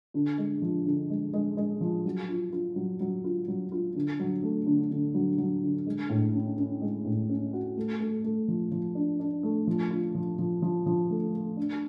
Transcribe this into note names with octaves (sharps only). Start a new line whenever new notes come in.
D3
G#3
F3
D3
G#3
G#3
G#3
F3
F#3
F4
F4
F#3
F#3
F4
F#3
F4
D3
F#3
A3
D3
D3
F#3
F#3
D3
G#3
A2
C#4
C#4
G#3
A2
C#4
F#4
A3
A3
A3
F3
F3
D4
D4
A3
F3
F4
F3
F3
F3
F3
A3
A3
D4